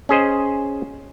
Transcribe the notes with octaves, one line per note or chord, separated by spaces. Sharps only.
C#4 G#4 C5 D#5